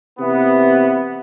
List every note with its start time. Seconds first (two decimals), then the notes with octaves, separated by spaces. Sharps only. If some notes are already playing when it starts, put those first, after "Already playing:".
0.20 C3 E3 B3